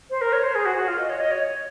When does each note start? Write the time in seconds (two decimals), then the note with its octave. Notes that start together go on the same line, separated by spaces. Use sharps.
0.10 C5
0.21 A#4
0.33 C#5
0.43 C5
0.55 G#4
0.66 F#4
0.76 F#4
0.88 F4
0.98 D#5
1.09 C#5
1.20 D#5
1.31 C#5